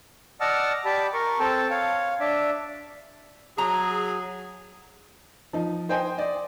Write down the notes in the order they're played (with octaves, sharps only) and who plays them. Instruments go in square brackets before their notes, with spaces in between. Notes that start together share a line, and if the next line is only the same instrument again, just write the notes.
[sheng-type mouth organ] D5 D#5 F#5 A5 E6 F6
G4 D5 A5 B5
A#4 C#6
C4 A4 G5 A5
C#5 F5
D4 D5 E5
[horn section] F#3 G#4 [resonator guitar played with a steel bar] A#5
[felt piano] F3 D#4
C5 D#5 G5 G#5 C6
D5 D#5